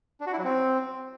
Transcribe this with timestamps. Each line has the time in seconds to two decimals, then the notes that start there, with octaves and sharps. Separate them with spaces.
0.21 D4
0.27 F#4
0.33 E4
0.39 F#3
0.45 C4